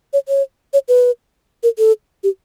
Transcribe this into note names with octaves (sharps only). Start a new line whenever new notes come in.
C#5
C#5
C#5
B4
A#4
A4
G4